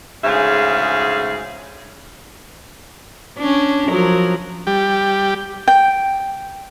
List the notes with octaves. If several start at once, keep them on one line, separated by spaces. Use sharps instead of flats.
D2 G#2 C#3 G#4 E5 F5
C#4 D4
F3 F#3 A#4
G3 G4
G5